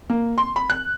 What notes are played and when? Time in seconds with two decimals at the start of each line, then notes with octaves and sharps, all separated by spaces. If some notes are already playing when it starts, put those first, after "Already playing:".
0.10 A#3
0.38 C6
0.56 B5
0.70 F#6